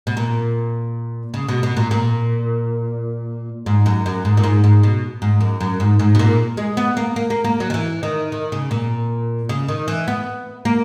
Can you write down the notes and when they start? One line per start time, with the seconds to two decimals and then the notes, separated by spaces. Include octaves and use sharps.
0.07 B2
0.17 A#2
1.34 C#3
1.48 B2
1.63 B2
1.77 A#2
1.91 A#2
3.66 G#2
3.86 F#2
4.06 F#2
4.25 G#2
4.37 A#2
4.43 G#2
4.64 G#2
4.83 B2
5.22 G#2
5.41 F#2
5.60 F#2
5.80 G#2
5.99 G#2
6.15 B2
6.19 A#2
6.57 G#3
6.77 B3
6.97 A#3
7.16 A#3
7.30 A#3
7.44 A#3
7.60 F#3
7.70 D#3
7.74 E3
8.03 D#3
8.32 D#3
8.52 C#3
8.71 A#2
9.49 C#3
9.68 D#3
9.88 E3
10.08 B3
10.65 A#3